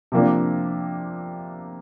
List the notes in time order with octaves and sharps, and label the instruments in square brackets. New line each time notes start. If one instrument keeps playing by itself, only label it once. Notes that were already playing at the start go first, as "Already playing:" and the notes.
[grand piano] C3 F3 A#3 D4